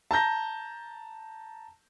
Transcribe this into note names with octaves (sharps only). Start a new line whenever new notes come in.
A5 A#5 G6 A#6